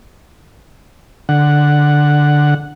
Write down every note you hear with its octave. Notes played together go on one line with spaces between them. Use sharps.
D3 F#5